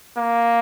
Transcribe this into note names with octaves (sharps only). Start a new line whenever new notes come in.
A#3